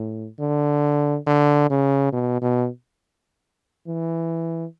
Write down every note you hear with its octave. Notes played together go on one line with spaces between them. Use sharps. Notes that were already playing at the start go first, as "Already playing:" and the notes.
Already playing: A2
D3
D3
C#3
B2
B2
E3